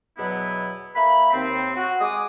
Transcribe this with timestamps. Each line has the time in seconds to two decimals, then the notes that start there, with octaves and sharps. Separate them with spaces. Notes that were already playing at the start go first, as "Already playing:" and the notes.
0.18 E2 B2 F#3 B3 E4
0.95 A#3 E5 B5
1.33 D#2 C4
1.76 F#4
2.00 G#3 D6 D#6